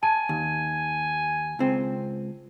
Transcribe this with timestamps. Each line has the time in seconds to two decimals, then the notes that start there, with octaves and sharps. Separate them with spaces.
0.03 G#5 A5
0.29 D#2
1.59 C#2 C4